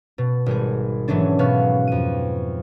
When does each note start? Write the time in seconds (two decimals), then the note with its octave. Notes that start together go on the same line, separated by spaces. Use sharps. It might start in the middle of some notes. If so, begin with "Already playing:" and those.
0.18 B2
0.46 G#1 G3 G#4
1.08 G#2 E3 F#3 A3 C#4 D4
1.39 B2 B3 C#4 F#4 F5
1.87 F2 D#7